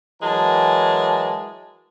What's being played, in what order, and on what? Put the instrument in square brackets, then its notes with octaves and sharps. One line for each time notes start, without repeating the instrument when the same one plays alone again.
[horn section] E3 F#3 G#3 A#4 A5